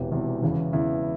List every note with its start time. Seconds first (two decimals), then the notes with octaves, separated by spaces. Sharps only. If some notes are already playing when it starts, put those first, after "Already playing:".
Already playing: E1 E2 C3 E3 G4
0.12 E1 E2 C3 E3
0.42 E2 C#3 E3
0.73 E2 C#3 E3 E4